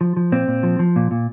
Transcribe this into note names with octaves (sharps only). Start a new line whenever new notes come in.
F3
F3
A#2 C4
A#2
F3
F3
A#2
A#2